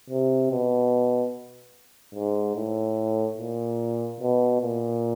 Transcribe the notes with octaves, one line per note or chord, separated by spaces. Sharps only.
C3
B2
G#2
A2
A#2
B2
A#2